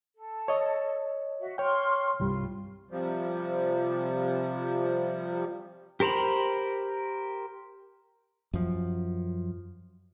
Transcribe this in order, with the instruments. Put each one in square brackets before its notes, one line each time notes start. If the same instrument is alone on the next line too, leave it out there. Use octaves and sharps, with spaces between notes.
[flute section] A4
[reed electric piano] C#5 D#5
[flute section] F#4 E5
[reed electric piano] C#5 G5 [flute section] C6 C#6 F6
[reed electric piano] C2 G2 G3 [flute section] F4
[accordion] C3 F3 G3
[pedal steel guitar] G4 A#4 C5 A#5 B5
[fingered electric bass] F#2 F3